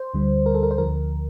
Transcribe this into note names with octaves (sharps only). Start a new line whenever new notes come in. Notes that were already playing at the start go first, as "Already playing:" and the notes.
Already playing: C5
D2 D3 G3
A#4
A4
A#4
C5
D2 D3 F3 A#4